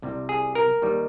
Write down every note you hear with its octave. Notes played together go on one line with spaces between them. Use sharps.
C2 C3 G3
G#4
A#4
D#2 D#3 G3